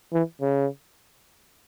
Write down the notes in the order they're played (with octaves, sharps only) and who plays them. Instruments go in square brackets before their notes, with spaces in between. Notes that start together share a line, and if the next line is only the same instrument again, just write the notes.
[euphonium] E3
C#3